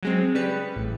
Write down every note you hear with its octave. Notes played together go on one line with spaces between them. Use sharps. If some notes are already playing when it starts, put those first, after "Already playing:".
F#3 G#3 C4
C#3 G3 B4 C#7
A1